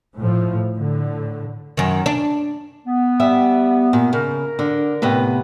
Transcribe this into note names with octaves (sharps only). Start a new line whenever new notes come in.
A2 F3
A2 D3
F#2 D#3
D4
B3
G3 E5
A#2
C#3 A#4
D3
A2 C3 B3